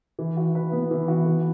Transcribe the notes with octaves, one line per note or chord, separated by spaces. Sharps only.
E3
F#4
B4
B3
E3
F#4
E3